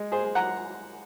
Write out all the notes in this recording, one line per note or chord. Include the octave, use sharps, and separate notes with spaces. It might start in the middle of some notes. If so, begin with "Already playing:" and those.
Already playing: G#3
G#4 C5
G#3
F#5 A#5